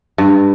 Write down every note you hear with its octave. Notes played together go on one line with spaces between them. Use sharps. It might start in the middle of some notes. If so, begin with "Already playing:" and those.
G2